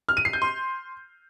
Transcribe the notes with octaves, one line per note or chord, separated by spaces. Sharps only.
F6
D#7
C7
G6
C6